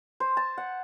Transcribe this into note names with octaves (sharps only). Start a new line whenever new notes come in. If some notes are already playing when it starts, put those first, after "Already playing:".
C5
A5
F#5